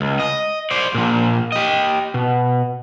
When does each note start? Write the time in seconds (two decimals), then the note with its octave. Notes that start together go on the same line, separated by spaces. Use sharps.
0.01 C#2
0.20 D#5
0.71 C5 D5
0.95 A#2 F3
1.52 G4 D#5
2.14 B2